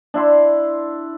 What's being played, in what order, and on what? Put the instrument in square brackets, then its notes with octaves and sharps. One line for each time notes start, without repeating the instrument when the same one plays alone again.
[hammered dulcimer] D4 E4 C6